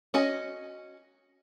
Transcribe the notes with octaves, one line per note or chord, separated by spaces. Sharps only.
C#4 F#4 D#5 G#5